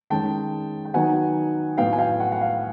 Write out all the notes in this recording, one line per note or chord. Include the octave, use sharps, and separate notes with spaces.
D#3 G#3 C#4 G5 A5
G5
D#3 F#3 B3 D#4 F#5 G#5
A2 F#3 B3 F5 G5
G#5
F5 G5
F#5
F#5
F5